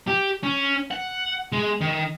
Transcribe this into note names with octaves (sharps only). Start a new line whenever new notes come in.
G4
C#4
F#5
G#3
D#3